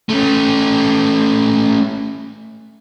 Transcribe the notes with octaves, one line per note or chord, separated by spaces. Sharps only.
A3 C#4